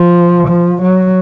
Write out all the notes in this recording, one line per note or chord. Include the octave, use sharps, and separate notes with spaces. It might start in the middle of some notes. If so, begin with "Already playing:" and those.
Already playing: F3
F3
F#3